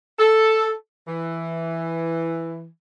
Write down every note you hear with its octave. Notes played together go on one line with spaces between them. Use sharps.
A4
E3